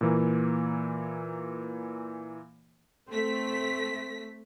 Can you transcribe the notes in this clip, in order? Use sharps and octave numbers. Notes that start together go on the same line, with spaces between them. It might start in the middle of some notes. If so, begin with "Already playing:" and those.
A#2 E3 A#3
A3 C4 B6